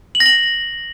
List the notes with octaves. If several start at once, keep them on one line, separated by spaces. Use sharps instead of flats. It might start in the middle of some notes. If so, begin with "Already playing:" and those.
F#7
A#6
F#7